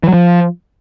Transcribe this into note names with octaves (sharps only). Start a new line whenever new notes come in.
E3
F#3
F3